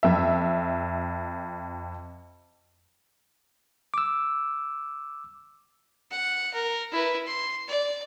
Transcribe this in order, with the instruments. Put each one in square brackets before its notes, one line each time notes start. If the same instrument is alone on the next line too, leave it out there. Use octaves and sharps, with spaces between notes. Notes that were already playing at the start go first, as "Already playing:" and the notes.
[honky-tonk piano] F2 E5
[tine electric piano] D6 E6
[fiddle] F#5
A#4
E4 B4
C6
D5